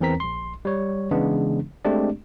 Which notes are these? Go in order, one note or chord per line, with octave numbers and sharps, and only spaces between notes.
E2 E3 C4 A#4 A#5 B6
A#1 C6
G3 C#5
C#3 E3 G#3 B3 D4
G#3 A3 C4 D4 G4 D5